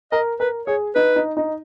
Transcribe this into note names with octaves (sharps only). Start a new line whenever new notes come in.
A#4 D#5
A#4 B4
G#4 C#5
D#4 B4
D#4
D#4